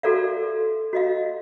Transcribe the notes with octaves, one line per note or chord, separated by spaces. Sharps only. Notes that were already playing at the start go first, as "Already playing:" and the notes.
F#4 A4 A#4 D5 F5
F#4 D#5 F5